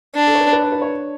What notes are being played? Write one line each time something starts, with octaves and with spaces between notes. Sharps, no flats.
D4
A4
C#5
B4
B4
D5
B4
C#5